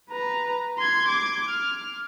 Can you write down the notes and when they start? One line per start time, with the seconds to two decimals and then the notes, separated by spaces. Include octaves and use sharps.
0.11 B4 A#5
0.78 C6 G#6
1.08 D6 G#6
1.49 F6